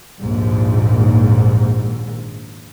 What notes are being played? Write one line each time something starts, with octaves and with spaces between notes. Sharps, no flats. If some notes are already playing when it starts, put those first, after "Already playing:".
A#1 D#2 G#2